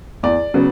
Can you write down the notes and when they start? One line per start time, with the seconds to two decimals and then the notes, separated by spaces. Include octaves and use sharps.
0.23 E2 D5
0.54 C#3 F#3 B3